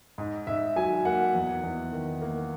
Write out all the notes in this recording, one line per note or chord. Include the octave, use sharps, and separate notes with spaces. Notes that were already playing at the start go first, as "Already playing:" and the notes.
G#2
G#2 E5
F#3 G#5
A#3 F#5
E2
E2
D#3
A#3